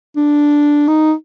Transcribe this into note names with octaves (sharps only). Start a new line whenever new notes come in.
D4
D#4